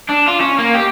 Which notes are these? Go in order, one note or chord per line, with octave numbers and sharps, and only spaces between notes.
D4
F4
C#4
A#3
G4